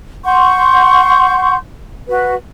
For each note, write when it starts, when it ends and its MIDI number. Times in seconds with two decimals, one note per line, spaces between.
0.24 1.56 78
0.24 1.56 84
0.24 1.56 85
0.24 1.56 91
2.08 2.35 66
2.08 2.35 71